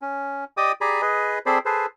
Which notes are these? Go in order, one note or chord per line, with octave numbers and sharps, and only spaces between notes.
C#4
G4 D5 D#5 G5 D6 D#6
G4 G#4 D5 G#5 A#5 B5
G#4 B4 D#5
C4 G#4 A4 C5 D5 B5
G#4 A4 B4 C5